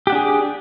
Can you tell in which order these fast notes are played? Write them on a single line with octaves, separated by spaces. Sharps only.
G4 F#5 D4 G#4